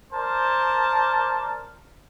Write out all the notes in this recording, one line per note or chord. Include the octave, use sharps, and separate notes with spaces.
A#4 C5 D5 A5